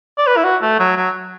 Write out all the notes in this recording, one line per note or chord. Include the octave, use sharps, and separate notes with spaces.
D5
B4
E4
F#4
A3
F#3
F#3